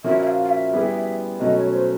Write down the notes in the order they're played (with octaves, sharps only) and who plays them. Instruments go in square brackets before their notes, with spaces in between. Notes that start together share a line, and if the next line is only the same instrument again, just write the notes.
[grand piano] A#2 F3 A#3 C#4 F#4 [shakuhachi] E5
[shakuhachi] E5
F5
F5
E5
[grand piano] G3 B3 E4 G#4
[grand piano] B2 F#3 A3 C#4 [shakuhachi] D#5
[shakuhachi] C#5
C5